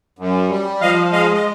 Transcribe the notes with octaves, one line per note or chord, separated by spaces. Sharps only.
F#2
G3
F3 D#5 F5
G#3 D#5 F5
D#5